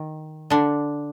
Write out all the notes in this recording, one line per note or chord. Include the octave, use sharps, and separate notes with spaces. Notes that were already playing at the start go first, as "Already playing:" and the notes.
Already playing: D#3
D3 D4